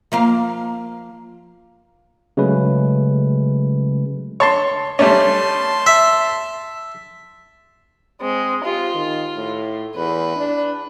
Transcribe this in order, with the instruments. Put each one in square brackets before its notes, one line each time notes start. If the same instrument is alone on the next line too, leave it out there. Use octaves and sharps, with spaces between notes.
[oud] F3 A#3 F5
[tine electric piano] C#3 F#3 G#3 A3 C#4 B4
[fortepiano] C#5 A5 C6
[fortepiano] G3 A3 C#4 [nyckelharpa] A5 C6
[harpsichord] E5
[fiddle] G#3 [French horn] C4
[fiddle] F4 [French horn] G4
[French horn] D#3
A2
[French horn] E2 [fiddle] B4
[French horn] D4